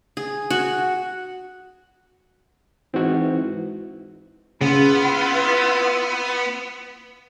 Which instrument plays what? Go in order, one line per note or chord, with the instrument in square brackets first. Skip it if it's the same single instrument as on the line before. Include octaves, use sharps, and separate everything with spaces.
[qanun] G#4
F#4
[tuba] G#2 [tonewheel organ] E3 [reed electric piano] C4 F#4
[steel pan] C#3 [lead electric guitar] B3 [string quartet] E4 F4 B4